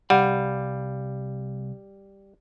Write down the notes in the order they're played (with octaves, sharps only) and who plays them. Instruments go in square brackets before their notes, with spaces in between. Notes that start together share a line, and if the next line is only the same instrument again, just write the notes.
[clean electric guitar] C2 F5 B5 [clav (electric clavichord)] G3 [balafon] F#5